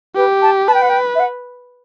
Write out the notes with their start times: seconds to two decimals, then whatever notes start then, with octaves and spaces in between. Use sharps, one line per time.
0.16 G4 B4
0.42 A5
0.67 B4 A5
0.74 G5
0.82 F#5
0.89 G5
1.15 E5
1.19 F#5